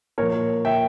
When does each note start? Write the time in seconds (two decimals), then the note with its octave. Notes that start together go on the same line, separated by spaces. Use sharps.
0.18 A#2 A#4 C#5
0.22 F3
0.65 E5 G5